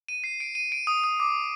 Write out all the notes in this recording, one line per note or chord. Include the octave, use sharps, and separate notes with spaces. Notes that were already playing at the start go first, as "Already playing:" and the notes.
D#7
C7
D7
D#7
D7
D#6
D#6
D6